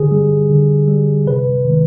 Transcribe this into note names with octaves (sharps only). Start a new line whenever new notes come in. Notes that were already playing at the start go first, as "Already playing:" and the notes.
Already playing: D3 G#4
G3
D3
G3
C3 B4
D#3 G#3